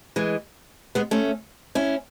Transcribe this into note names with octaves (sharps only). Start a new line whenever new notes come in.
E3 G#3
G#3 B3
A3 C#4
C#4 E4